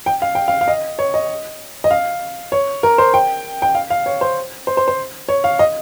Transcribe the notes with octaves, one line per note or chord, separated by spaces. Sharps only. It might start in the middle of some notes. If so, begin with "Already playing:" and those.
G5
F5
G5
F5
F5
D#5
C#5
D#5
D#5
F5
C#5
A#4
C5
G5
G5
F5
F5
C#5
C5
C5
C5
C5
C#5
F5
D#5